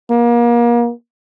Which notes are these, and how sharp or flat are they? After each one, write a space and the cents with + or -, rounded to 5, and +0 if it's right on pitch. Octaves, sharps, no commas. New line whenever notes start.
A#3 +35